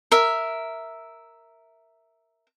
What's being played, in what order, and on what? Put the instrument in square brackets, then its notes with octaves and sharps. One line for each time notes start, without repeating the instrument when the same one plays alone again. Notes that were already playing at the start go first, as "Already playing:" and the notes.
[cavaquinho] A#4 E5